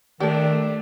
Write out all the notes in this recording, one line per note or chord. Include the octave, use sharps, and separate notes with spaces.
D#3 A3 D4 G4 A4